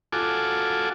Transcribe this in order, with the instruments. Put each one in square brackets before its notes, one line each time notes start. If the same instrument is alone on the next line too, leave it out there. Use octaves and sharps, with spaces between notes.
[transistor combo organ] F4 F#4 A4 G#5 D6